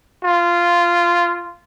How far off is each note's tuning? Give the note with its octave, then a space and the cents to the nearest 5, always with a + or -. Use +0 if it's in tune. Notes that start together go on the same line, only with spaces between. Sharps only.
F4 -10